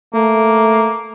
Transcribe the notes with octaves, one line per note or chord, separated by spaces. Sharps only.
A3 A#3